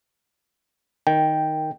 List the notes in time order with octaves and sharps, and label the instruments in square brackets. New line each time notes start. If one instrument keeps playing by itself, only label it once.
[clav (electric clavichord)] D#3 [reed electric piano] G5